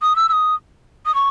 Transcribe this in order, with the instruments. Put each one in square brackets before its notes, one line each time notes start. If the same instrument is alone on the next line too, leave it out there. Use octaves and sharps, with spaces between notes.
[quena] D#6
E6
E6
D#6
D#6
C#6